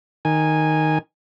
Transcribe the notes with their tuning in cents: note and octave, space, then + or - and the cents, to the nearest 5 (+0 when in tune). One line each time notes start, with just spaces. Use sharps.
D#3 +0 G#5 -10